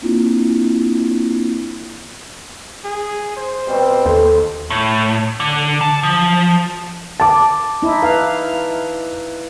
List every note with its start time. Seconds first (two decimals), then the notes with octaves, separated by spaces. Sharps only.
0.02 A#3 C4 D4 E4 F4
2.85 G#4
3.37 C5
3.68 B2 G3 C4
4.06 D#2 A4
4.70 A2
5.40 D3
5.81 A5
6.03 F3
7.20 A5 D6
7.82 D#4 E4
8.03 B4 F5